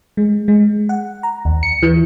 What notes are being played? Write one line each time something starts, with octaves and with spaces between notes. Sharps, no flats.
G#3
G#3
F#5
A#5
D#2
C#7
E3